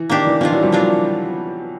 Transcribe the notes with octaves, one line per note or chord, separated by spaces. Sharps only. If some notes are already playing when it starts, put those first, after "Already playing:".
Already playing: E3
D#3 A#3 D4 G4
E3
D#3 F3 A#3 D4 F4
E3 F#3
F3 G3
E3 F#3 A#3 D4 F4